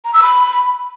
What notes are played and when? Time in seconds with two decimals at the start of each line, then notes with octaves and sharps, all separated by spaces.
0.05 A#5
0.14 E6
0.22 B5